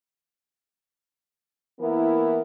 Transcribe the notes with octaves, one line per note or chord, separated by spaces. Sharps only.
E3 A#3 B3 E4 A#4